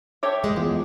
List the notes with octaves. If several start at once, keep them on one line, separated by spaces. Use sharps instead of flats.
A4 C#5 E5 G5 D6
F#2 G#3
E2 E3 B3 F4